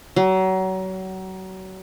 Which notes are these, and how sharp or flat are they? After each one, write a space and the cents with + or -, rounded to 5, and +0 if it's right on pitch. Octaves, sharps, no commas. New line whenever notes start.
F#3 +30